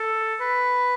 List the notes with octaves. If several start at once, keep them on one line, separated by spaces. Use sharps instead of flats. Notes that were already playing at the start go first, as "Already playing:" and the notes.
Already playing: A4
B4